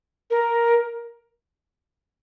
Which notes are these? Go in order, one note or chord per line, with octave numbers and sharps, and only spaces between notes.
A#4